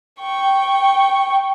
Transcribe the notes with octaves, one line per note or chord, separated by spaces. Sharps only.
G5 C#6